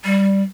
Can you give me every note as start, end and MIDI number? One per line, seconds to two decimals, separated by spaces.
0.05 0.42 55